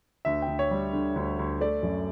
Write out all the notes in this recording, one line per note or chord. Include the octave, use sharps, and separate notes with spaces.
D2 E5
G5
D2
C#5
G3
D3
D2
D2
A3 D5
F#2